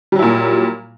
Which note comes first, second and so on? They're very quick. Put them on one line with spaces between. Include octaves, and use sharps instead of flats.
G3 F#3 E4 A#2